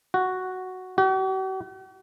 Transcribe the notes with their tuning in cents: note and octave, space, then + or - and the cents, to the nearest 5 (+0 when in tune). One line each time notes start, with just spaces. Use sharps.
F#4 +0
F#4 +45